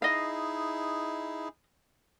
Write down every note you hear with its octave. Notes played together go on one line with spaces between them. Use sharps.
D#4 E4 G#4 D#5 F5